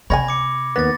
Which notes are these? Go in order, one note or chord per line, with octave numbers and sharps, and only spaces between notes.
C3 C#5 D#5 G#5 B5 G#6 A#6
D6 C#7
D#2 B3 A6 A#6